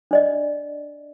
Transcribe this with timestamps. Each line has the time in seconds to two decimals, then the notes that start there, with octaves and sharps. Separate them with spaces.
0.11 D4 D5 D#5